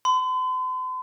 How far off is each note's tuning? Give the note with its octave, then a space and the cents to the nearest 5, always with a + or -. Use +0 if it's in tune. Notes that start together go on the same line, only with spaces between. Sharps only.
C6 -45